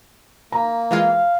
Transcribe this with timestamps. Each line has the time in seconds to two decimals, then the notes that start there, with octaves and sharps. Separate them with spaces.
0.52 A#3 A#5
0.91 E3 G#3 F4 F5